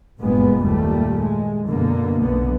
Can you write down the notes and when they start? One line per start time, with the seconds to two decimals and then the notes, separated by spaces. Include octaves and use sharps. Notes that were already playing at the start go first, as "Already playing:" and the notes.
0.19 F#1 G2 A#2 G#3 B3
0.63 D#2 A#2 G3 A3
1.21 G#3
1.68 F#2 B2 D3 A#3
2.17 B1 D3 B3